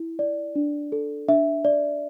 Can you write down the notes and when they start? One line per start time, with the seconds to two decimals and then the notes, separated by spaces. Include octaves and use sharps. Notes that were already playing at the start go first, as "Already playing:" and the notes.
Already playing: E4
0.19 D5
0.55 D4
0.92 A4
1.29 D4 E5
1.65 D5